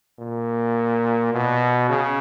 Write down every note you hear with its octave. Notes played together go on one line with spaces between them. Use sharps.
A#2
B2
C#3